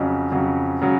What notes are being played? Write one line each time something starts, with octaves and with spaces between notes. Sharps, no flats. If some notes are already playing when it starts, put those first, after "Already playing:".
Already playing: F2 C#3 F#3
F2 C#3 F#3
C#3 F#3